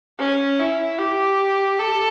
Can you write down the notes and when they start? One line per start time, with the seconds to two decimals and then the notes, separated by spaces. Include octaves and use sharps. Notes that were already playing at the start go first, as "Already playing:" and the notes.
0.18 C#4
0.59 E4
0.99 G4
1.79 A4